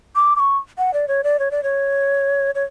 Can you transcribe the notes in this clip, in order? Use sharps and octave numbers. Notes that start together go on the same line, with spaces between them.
D6
D6
C#6
F#5
D5
C#5
D5
C#5
D5
C#5
C#5